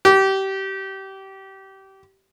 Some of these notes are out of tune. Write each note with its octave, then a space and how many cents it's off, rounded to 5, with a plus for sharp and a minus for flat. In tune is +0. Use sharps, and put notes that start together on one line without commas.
G4 -25